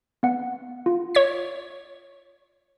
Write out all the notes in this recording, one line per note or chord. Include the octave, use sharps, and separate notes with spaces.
B3 F#5
F4
C#5 G#6 B6